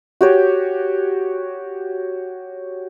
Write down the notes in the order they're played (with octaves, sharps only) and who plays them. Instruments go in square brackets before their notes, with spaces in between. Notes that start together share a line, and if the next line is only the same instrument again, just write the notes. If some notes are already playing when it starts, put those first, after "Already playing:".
[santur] F#4 G4 C#5